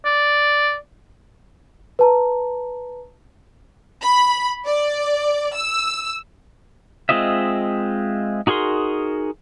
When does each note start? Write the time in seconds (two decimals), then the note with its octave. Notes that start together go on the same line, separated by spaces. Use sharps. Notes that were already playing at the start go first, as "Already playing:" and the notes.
0.05 D5
1.99 B4 A5 A#5
4.01 B5
4.65 D5
5.56 E6
7.09 G#3 C4 F4 D#5 E5
8.47 D#4 F#4 G#4 A#4 C6